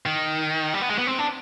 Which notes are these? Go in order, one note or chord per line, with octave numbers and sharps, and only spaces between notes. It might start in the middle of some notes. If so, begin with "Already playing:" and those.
D#3
G3
B3
G#3
B3
C4
D4